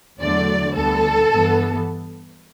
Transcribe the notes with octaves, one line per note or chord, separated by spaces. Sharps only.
E2 D3 F#3 A3 D5
D2 D3 G3 B3 A4
G2 E3 B3